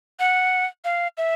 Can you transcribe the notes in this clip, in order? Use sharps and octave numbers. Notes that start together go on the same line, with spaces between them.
F#5
F5
E5